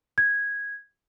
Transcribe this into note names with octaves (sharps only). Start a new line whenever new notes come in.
G#6